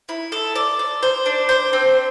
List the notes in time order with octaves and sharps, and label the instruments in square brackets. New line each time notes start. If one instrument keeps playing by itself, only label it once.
[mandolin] E4
A4
D5
D5
C5
D4
C5
C4